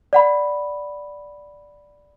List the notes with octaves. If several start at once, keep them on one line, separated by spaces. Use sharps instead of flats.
D5 F#5 B5